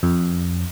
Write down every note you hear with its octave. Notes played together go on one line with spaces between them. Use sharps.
F2